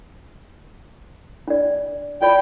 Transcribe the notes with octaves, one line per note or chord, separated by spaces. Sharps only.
D4 D5
F4 D5 G5 B5